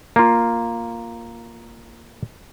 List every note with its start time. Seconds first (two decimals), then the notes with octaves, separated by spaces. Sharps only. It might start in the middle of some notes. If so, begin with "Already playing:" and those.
0.16 A#3 F4